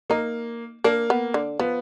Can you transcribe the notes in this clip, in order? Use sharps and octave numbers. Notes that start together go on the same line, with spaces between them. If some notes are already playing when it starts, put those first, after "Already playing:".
A#3 D#4
A#3 D4
B3
D3
F3 B3